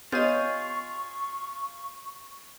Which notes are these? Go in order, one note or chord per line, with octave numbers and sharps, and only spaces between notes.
B3 F4 G4 G#4 C#5 D#5 C#6 G6